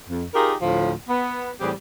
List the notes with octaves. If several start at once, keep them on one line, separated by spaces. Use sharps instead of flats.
F2
D#4 F4 G4 G#4 A#4
D2 A2 F3
B3
A2 E3 G3 C4 G4 G#4